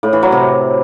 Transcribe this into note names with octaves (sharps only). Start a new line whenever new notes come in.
A2
E3
F#3
C3